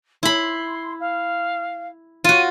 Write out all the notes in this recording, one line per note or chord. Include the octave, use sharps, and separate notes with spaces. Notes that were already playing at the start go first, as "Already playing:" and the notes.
E4 B5 C6
F5
F4 F#4 D#7